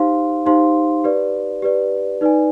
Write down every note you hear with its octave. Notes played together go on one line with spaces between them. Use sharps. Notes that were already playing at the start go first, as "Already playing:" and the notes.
Already playing: D#4 G4 C5 F5 C6
D#4 G4 C5 F5 C6
G4 B4 D5
G4 B4 D5
D#4 B4 D5 G#5